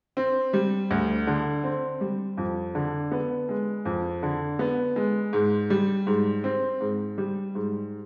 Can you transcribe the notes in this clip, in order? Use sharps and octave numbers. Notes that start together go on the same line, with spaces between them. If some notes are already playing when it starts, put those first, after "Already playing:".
C4
G3
D2
D3
C4
G3
F2
D3
B3
G#3
F2
D3
B3
G#3
G#2
G3
G#2
C4
G#2
G3
G#2